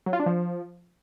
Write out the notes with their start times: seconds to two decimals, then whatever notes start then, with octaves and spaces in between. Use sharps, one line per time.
0.06 F#3
0.13 F4
0.20 D4
0.26 F3